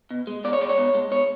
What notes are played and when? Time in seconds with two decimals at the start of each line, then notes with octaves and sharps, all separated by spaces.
0.11 B2
0.27 G#3
0.44 B2 D5
0.53 C#5
0.61 G#3 D5
0.69 C#5
0.78 B2
0.95 G#3
1.11 B2 C#5